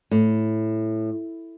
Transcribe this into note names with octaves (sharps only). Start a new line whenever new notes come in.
A2